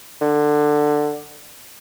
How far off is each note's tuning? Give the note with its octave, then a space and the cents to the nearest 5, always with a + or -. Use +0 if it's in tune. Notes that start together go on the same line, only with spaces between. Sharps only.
D3 +15